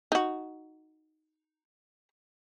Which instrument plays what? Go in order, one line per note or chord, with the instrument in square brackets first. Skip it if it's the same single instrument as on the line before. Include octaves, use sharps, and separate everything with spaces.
[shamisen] D#4 F#4